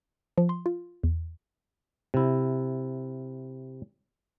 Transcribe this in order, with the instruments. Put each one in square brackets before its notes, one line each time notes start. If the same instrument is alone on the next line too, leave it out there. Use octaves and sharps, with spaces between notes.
[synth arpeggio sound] F3
C6
F4
E2
[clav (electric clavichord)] C3 E4